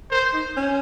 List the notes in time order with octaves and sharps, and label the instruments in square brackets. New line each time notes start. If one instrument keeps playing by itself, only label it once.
[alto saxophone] A#4 [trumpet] C5
[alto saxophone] D#4
C#4